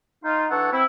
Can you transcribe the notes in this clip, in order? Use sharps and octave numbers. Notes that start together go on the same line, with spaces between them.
D#4 F4
E3 D4 A4 C#5 F#5
C4 E4